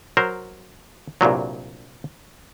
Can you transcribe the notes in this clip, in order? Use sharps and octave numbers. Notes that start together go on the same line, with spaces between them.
F#3 A#4 C5
C2 G2 A#2 F#3